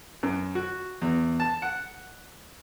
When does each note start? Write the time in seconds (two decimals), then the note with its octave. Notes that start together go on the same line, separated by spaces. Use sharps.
0.23 F#2
0.55 F#4
1.01 E2
1.40 A5
1.62 F#5